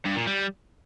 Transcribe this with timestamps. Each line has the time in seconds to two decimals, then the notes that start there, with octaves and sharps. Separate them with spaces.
0.05 G2
0.16 A#2
0.27 G3